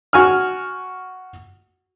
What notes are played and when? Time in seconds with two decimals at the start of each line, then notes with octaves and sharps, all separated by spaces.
0.13 F#4 G#5 F6